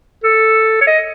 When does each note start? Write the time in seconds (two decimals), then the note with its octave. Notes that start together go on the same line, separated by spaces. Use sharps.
0.24 A4
0.81 C#5
0.87 D#5